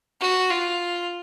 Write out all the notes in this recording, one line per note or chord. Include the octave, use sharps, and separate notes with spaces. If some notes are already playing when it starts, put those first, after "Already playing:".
F#4
F4